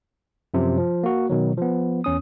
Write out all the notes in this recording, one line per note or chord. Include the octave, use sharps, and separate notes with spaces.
F#2 C3 F3
F3
A#3 F#4
B2 D#3 F#3
F3 B3
E2 C#4 D#6